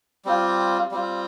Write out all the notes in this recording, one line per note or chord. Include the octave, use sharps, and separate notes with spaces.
G3 C4 F4
G3 C4 F4